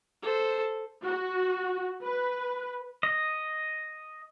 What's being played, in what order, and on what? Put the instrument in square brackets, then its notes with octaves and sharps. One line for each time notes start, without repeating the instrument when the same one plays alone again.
[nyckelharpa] A4 C5
[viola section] F#4
B4
[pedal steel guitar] D#5